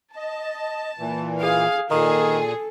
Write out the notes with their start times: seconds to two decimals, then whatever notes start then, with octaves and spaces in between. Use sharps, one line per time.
0.16 D#5 A5
0.99 A#2 E3
1.41 G#4 F5
1.91 A#2 D#3 G#4 A4